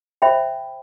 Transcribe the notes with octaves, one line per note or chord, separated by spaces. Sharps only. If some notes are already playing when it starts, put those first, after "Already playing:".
C5 E5 G5 B5